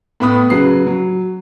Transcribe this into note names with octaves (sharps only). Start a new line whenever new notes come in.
A2 B3 B5 D#6
C#3 F#3 B4 C7
F#3